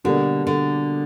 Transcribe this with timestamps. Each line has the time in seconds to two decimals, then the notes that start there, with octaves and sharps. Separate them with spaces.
0.04 B2 D3 G3 A#3 D4
0.47 D3